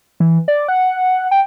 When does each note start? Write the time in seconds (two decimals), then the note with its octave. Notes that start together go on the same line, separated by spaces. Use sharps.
0.20 E3
0.48 D5
0.68 F#5
1.31 G5